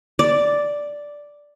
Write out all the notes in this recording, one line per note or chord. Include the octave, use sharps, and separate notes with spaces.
D5